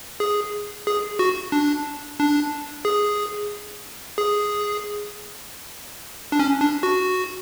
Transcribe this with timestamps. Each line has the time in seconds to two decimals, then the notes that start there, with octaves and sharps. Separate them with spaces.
0.20 G#4
0.87 G#4
1.19 F#4
1.52 D4
2.20 D4
2.85 G#4
4.18 G#4
6.32 D4
6.39 C#4
6.61 D4
6.83 F#4